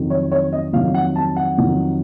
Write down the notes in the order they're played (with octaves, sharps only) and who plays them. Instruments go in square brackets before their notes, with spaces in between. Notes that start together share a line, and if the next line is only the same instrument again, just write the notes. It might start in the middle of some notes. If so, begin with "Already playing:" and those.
Already playing: [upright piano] F2 D#3 F#3
C#5
C#5
D#5
F2 D#3 F#3 F5
F#5
A5
F#5
F2 D#3 F#3